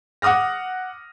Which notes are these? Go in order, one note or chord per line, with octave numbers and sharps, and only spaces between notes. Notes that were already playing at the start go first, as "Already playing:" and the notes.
F#5 D6 D#6 F6 A#6